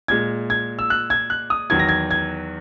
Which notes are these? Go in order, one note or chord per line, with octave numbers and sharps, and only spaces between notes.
A#2 G#3 G#6
G#6
E6
F#6
G#6
F#6
D#6
E2 D#3 F#3 G#6
A#6
G#6
G#6